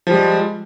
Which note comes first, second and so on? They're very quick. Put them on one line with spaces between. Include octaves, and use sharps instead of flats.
F3 G3 G#3